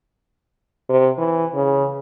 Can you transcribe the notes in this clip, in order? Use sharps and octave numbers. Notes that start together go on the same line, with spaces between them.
C3
E3
C#3